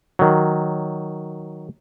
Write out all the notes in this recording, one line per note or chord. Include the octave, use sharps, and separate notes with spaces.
D#3 F#3